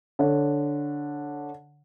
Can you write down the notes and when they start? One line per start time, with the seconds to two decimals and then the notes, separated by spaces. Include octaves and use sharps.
0.19 D3 C#5